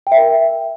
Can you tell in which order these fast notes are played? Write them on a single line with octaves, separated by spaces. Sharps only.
G5 E5 A#4